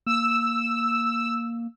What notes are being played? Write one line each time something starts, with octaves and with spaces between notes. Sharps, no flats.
A#3 E6